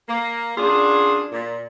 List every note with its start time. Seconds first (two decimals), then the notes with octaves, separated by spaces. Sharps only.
0.08 A#3
0.57 F#2 D4 F4 G#4
1.32 A#2